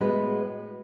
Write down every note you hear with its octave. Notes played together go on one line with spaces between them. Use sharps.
A2 G#3 B3 F#4 B4